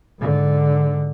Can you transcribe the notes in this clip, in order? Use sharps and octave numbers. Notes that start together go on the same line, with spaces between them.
G#2 D3